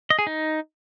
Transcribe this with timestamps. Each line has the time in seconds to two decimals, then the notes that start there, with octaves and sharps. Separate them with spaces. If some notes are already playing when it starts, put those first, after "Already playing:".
0.10 D#5
0.19 G#4
0.27 D#4